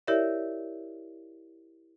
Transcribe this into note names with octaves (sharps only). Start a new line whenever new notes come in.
E4 G4 A#4 C#5 D5 E5